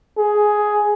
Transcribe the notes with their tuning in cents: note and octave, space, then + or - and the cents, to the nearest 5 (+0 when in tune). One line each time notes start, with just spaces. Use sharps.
G#4 +10